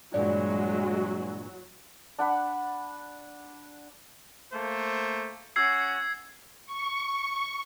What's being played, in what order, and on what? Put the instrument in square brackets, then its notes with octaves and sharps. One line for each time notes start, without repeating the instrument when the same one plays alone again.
[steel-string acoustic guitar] G2 A#2 E3 [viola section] F#3 F#4 [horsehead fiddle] G#3 [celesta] D5
[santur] D4 F#5 B5
[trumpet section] A3 A#3 C5
[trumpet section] C#4 F#4 [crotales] E6 G#6 C7
[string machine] C#6